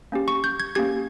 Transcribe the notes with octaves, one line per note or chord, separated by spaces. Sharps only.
A#3 C#4 G4
C#6
G6
G#6
A#3 C#4 G4 G#6